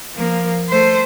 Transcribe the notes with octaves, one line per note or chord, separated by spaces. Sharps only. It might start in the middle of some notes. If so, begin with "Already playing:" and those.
F3 A#3
A3 C5